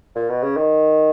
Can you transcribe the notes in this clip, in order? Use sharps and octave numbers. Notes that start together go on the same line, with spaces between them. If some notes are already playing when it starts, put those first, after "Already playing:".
A#2
B2
C#3
D#3